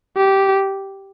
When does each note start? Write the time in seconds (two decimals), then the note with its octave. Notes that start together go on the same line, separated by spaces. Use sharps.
0.17 G4